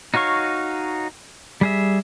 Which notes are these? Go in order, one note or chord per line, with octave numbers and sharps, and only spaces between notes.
D#4 F#4 C#5 F5 C#6
G3 G#4 E5